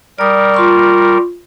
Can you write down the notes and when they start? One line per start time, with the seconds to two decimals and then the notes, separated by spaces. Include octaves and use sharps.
0.19 G3 A#4 D5 D#6
0.54 F4 C6 C#6